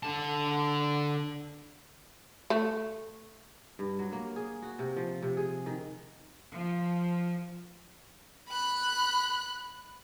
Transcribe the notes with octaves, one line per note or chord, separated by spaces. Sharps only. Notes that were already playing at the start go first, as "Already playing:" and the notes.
D3 A5
A3
G2
F#3
A#3
G#4
F#4
C3
F3
C3
G#4
D#3
F3
B5 F#6